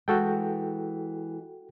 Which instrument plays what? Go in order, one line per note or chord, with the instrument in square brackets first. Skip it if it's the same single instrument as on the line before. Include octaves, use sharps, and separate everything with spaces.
[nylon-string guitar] E3 G#3 [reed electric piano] F#4 A4 G5